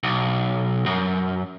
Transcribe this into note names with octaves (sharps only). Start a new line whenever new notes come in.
B1
F#2